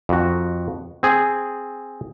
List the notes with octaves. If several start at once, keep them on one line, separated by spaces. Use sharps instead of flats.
F2 F#4
C4 G#4